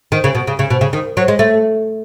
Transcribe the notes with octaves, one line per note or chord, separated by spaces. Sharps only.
D#3
C#3
B2
C#3
C#3
B2
C#3
D#3
F#3
G#3
A3